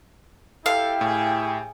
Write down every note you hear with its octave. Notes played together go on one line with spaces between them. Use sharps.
E4 G4 A4 F5 G5
A2 G#4